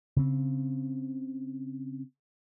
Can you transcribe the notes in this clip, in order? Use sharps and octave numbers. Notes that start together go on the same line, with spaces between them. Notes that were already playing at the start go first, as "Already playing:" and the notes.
C#3 C4